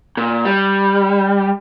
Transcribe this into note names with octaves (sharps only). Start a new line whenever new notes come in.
A#2
G3